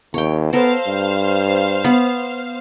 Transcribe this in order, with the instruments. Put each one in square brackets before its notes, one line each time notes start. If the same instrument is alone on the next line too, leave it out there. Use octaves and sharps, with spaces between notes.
[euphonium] D#2 [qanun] C#5 G5
[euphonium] B3 [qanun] A4 A#4 [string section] C5 F5
[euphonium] G2
[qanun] B3